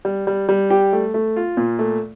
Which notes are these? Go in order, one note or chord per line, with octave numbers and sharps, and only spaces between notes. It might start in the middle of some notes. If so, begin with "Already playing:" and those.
G3
G3
G3
G4
A3
A3
F4
A#2
A3